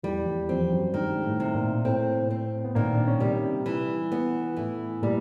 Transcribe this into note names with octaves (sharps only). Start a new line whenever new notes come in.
E2 E3 G3
E2 E3
F2 F3 C4
F#2 F#3
F#3
G2 D#3 G3
G#3
A2 A3
C3
A#2 A#3
A2 A3 C4
C4
B3
A#2 D#3 A#3
D4
C#4
C3 G3 C4
E3
B3
A2 E3 A3
A#2 G3 A#3